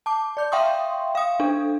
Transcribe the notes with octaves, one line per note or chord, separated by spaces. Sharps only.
A5 D6
D5 G6
E5 F5 G5 C6 C#6 D#6
F5 D#6
D4 A4